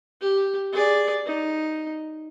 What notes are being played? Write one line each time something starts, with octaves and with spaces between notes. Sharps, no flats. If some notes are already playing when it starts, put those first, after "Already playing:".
G4
G#4 D5
D#4